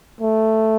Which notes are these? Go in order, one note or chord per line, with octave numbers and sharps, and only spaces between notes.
A3